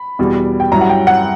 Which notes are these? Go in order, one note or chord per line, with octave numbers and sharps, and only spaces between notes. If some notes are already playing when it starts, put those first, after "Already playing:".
Already playing: B5
E2 B2 G3
G5
G2 F#3 C#4 E4 A#5
F#5
G5
F#5